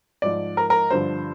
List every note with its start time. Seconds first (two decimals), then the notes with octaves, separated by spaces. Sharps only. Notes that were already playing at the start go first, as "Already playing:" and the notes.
0.22 G#2 F3 D5
0.57 A#4
0.70 A#4
0.90 G2 D3 F3 C5